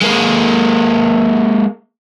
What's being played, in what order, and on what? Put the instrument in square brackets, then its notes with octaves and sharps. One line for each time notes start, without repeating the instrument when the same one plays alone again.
[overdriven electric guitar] G#3 A#3